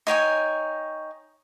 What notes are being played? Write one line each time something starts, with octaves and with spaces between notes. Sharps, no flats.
D#4 C#5 G5 G#5